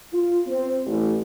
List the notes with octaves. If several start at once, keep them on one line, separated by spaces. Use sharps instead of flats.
F4
C4
A1